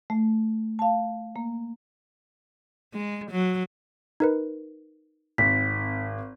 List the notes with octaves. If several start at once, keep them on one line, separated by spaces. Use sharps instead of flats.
A3
F5 A5
A#3
G#3
F#3
D#4 A#4 B4
G#1 C4 B6